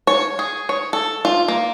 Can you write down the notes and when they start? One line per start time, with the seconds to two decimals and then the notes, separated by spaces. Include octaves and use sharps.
0.07 C#5
0.39 G#4
0.69 C#5
0.93 A4
1.25 F4
1.48 A#3